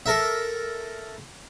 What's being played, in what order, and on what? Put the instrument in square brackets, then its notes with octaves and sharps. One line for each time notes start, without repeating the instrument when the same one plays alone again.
[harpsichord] A4 A#4 E5